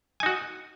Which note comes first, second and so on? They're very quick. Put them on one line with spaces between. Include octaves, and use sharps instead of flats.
G#5 D#4 F#4